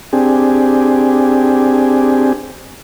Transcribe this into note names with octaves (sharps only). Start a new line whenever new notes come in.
C4 D4 G4 G#4